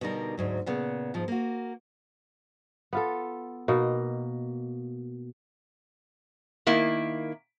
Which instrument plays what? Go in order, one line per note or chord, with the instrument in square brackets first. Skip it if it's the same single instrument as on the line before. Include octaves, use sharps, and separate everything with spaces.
[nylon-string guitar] B2 D3 G3 D#4 A#4
D2 G#2 F#3
A#2 C#3 B3
G#2 F3
A#3 F#4
[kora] B3 F4 A4
B2 A#3 D#4
[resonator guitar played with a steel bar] D#3 A#3 E4